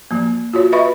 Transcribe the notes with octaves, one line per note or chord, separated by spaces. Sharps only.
F3 A#3
F4 F#4 C#5
B4 D#5 E5 B5 C#6